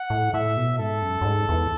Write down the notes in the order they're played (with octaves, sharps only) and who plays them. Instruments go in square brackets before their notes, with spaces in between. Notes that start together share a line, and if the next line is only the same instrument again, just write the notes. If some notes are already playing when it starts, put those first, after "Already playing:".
Already playing: [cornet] F#5
[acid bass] A2
[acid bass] A2 [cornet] E5
[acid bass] B2
[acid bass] G#2 [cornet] A4
[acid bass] F#2
F#2
G#2
E2